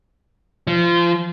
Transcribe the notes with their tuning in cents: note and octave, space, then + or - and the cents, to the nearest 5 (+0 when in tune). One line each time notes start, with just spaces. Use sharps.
F3 -25